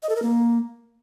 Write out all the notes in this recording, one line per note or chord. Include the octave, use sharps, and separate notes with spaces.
D#5
A4
A#4
A#3